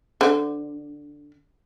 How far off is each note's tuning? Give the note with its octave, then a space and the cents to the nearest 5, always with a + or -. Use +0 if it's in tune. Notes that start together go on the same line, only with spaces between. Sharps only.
D3 +0 C5 -30